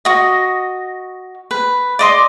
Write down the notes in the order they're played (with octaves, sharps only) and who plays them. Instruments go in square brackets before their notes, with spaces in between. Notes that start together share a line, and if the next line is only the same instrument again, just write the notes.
[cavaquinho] F#4 D#5
B4
D5 D#5 C6 D6